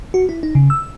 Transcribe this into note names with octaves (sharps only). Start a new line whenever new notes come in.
F#4
E4
D#4
C#3
E6